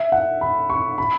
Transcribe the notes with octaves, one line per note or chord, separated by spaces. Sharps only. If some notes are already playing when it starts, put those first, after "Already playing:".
Already playing: E5
F#5
B5
C#6
B5